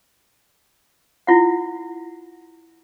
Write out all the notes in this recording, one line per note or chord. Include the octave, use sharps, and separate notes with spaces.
E4 F4 F#5